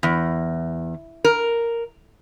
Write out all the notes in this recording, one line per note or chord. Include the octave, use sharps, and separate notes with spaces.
E2
A#4